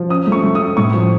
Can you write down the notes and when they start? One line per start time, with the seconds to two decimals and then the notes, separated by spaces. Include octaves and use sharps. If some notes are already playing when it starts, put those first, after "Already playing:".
Already playing: F3
0.09 C#4 D#6
0.27 A3
0.32 C#6
0.43 A3
0.55 D#6
0.60 C#4
0.77 A2 C#6
0.94 F3